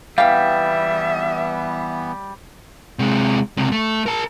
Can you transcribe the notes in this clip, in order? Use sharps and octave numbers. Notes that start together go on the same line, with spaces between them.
E3 G3 B3 E5 F5 G5
C3 G#3
C#2 C3
A3
A#4 A5